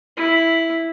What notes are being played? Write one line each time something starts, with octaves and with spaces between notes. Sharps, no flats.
E4